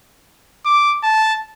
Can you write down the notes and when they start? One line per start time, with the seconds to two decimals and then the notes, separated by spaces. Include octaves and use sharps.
0.66 D6
1.03 A5